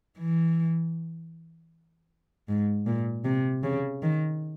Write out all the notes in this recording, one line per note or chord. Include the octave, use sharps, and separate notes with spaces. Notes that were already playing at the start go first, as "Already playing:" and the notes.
E3
G#2
A#2
C3
C#3
D#3